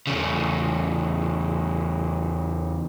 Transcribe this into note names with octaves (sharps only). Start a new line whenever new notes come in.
E2 C#3